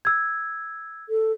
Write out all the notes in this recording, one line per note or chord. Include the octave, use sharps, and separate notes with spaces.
E6 G#6
A4